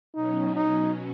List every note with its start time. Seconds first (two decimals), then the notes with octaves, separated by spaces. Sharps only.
0.15 B2 F#3 C#4 D#4
0.56 D#4